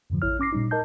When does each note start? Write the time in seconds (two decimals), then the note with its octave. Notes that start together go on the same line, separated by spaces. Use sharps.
0.10 F2 G#2 D3 F3
0.22 A1 E4 C#5 F6
0.40 C#4 D6 A#6 C7
0.53 A#2 G3 D#4
0.71 A#4 D#5 A5 G6